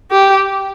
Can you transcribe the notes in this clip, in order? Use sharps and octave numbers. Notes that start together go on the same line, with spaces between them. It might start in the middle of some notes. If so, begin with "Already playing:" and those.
G4